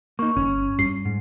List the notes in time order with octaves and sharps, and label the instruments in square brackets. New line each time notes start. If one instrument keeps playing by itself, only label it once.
[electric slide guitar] A#3 D#4 [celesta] C#6
[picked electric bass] G1 [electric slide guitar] C#4
[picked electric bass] G2 [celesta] C7
[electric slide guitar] G#2